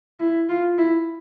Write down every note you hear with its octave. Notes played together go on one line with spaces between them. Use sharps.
E4
F4
E4